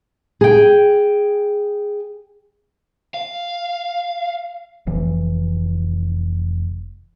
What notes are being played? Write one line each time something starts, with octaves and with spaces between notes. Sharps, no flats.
G#4 G5
F5
F1 E3